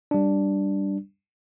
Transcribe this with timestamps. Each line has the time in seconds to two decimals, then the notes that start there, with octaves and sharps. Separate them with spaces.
0.11 G3 D4